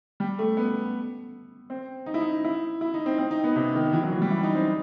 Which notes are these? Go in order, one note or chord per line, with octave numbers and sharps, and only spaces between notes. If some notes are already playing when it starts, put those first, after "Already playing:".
G3
A3
B3
C4
D#4
E4
D#4
E4
E4
D#4
C4
C4
D#4
B3
C3
D#3
E3
F#3
E3
G3
E4
D#4
C4